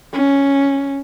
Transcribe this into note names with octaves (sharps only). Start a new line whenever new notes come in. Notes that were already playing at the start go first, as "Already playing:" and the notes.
C#4